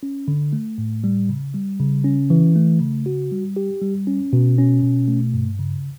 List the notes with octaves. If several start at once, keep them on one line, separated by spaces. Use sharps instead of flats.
C#4
D3
A3
A2
G3
C#3
G3
C#3
C#4
E3
A3
C#3
F#4
G3
G4
G3
C#4
B2
C#4
B2
A3
G2
C#3